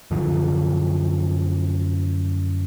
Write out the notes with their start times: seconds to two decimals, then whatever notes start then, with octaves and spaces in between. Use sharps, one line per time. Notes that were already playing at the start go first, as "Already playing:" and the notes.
0.11 F#2 D3 F3